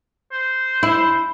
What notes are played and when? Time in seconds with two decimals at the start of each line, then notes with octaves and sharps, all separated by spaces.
0.31 C5
0.83 E4